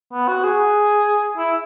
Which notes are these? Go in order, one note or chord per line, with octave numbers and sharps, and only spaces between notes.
B3
F#4
G#4
E4